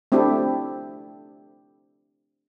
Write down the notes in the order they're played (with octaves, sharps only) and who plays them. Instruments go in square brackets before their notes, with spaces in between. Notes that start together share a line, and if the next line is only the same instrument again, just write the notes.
[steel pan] A3 C4 D4 E4 G4 A4